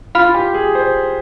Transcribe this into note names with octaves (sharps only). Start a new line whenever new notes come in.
F4 F5 B5 F6
F4
G4
G#4
C5